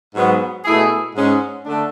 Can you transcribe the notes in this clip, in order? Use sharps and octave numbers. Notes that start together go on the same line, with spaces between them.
G#2 F#3 B3
B2 A3 E4 G#4
G#2 G#3 C#4
D3 A3 D4